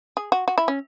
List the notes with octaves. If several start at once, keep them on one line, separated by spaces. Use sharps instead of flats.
G#4
F#4
F#4
E4
C#4